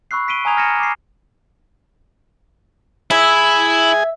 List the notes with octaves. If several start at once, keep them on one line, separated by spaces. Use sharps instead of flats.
B5 C#6 E6 F#6 C7
B5 B6 D7 D#7 G7
G#5 A#5 D#6 G#6 F7
F6 G#6 A#6 C#7 D#7 E7
D6 C7
E4 G#4 E5 G#5